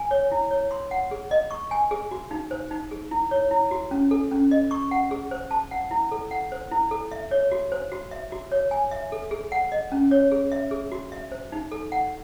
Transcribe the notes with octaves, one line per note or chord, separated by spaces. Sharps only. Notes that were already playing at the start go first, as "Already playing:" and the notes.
Already playing: G#5
C#5
E4
C#5
C6
F#5
G#4
D#5
C#6
G#5
G#4
F#4
D#4
C5
D#4
G#4
E4
C#5
E4
F#4
C#4
A4
C#4
D#5
C#6
F#5
G#4
C5
A5
F#5
E4
A4
F#5
C5
E4
A4
E5
C#5
F#4
C5
F#4
E5
F#4
C#5
G#5
E5
A4
G#4
F#5
D#5
C#4
C#5
G#4
E5
G#4
F#4
E5
C5
D#4
A4
F#5